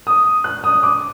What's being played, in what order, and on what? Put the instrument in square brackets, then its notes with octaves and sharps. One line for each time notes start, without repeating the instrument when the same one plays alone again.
[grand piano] D#6
F#6
D#6
D6